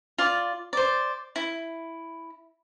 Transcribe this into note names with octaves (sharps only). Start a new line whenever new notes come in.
F4 D5
C5 D5
E4